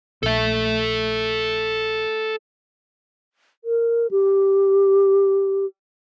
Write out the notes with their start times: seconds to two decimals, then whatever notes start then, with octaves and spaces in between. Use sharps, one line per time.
0.23 A#1 A4 E5
3.64 A#4
4.11 G4